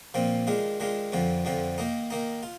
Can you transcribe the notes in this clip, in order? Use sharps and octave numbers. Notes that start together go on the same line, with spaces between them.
A#2 F3 C4
D#3 G#3 D4 F4
D#3 G#3 D4 F4
F2 D3 F3 C4
F2 D3 F3 C4
D#3 A#3 D#4
D#3 A#3 D#4
F4